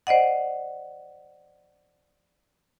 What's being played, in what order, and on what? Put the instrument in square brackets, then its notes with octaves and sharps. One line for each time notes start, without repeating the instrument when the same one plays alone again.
[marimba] C5 D5 D#5 F#5